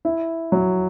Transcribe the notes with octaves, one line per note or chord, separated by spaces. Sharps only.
E4
F#3